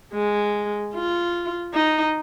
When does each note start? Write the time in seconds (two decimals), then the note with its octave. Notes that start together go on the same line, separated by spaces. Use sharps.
0.14 G#3
0.94 F4
1.74 D#4